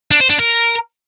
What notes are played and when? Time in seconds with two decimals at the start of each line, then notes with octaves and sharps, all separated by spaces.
0.11 D4
0.20 C5
0.30 D4
0.39 A#4